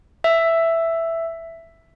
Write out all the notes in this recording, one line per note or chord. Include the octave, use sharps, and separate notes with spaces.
E5